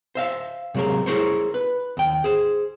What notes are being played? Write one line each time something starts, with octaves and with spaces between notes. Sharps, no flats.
C5 E5 F5
C3 F#3 G#3 A#3 A#4
E4 G#4 A#4 C5 C#5
B4
D#2 G5
G#4 C5